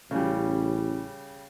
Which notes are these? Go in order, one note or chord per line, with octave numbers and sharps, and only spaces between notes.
A1 C#3 G3